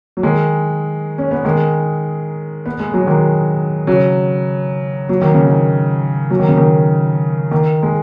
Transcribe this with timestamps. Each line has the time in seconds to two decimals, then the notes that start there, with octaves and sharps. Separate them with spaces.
0.17 F#3
0.23 D#3 G#3
1.18 C#4
1.31 B3
1.45 D#3 G#3
2.66 B3
2.80 G#3
2.93 F#3
3.07 D#3 G#3
3.87 C#3 F#3
5.09 F#3
5.21 D#3
5.34 C#3
5.47 D#3
6.31 F#3
6.39 D#3
6.48 C#3
6.57 D#3
7.51 D#3
7.83 G#3